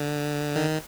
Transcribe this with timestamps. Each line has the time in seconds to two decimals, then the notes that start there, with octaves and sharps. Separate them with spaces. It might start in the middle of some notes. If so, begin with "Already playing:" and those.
Already playing: D3
0.56 D#3